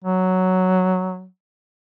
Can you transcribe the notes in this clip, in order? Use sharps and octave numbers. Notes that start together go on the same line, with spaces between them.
F#3